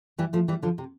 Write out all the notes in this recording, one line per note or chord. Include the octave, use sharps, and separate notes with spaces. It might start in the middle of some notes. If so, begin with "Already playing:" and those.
E3 G3
F3 A3
E3 G3
D3 F3
C3